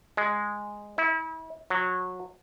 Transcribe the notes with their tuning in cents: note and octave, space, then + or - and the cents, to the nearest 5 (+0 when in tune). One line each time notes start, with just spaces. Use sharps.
G#3 -5
E4 -35
F#3 -20